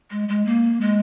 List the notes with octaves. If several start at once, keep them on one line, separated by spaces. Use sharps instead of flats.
G#3
G#3
A#3
G#3